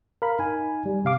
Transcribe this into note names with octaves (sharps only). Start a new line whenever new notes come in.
A#4 F5 B5
D#4 G#5
G3
C3 F5 D6